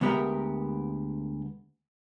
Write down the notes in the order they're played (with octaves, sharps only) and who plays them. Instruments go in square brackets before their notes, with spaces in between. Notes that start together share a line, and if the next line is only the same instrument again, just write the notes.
[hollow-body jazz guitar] D2 G#3 B3 G4 A#4 E5